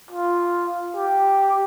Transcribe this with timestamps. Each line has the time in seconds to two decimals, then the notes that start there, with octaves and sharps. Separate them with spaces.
0.11 F4
0.97 G4